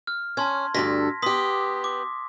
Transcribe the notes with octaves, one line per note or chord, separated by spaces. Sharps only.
F6
C#4 A5 C6 G#6
D2 G2 A4 A#6 B6
B3 G4 C6 D#6 B6
D6